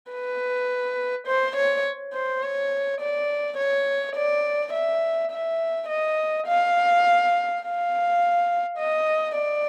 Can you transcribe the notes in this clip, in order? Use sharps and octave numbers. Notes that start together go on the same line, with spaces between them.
B4
C5
C#5
C5
C#5
D5
C#5
D5
E5
E5
D#5
F5
F5
D#5
D5